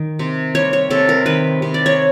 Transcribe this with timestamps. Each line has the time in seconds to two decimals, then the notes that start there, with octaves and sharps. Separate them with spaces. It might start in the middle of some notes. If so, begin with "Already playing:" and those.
Already playing: D#3
0.19 C3
0.55 G3 C#5
0.73 C#5
0.90 C3 A4
1.09 A#4
1.26 D#3 B4
1.62 C3
1.74 D5
1.86 C#5